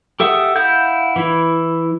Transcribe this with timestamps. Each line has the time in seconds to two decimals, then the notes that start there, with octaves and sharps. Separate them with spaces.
0.20 G4 A4 E5 F#5 D#6
0.56 E4 F5 F#5 G6
1.16 E3 E4